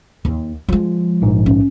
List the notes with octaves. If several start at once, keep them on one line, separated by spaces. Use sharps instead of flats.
D#2
F3 G#3
A#1 G#2
C#4